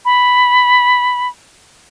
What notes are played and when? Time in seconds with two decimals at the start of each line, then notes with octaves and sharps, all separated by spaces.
0.05 B5